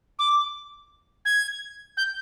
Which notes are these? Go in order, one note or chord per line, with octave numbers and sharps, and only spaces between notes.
D6
G#6
G6